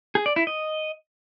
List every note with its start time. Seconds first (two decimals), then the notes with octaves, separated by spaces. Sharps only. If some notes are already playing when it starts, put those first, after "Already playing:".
0.15 G#4
0.26 D5
0.36 E4
0.47 D#5